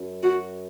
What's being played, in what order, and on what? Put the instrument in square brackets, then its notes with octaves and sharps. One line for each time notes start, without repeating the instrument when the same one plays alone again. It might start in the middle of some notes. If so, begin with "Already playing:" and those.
Already playing: [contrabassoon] F#2
[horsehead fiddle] F#4